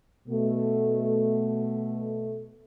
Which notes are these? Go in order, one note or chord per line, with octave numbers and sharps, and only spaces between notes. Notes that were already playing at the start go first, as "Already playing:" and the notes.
B2 A3